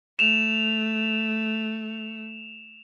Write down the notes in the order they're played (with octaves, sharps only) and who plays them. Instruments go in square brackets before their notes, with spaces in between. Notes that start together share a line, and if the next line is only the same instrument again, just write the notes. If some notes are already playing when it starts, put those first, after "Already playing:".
[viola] A3 [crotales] E7 F7